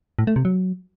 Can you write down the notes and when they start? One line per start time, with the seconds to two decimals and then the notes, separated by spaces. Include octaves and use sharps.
0.19 A2
0.27 A3
0.36 C3
0.45 F#3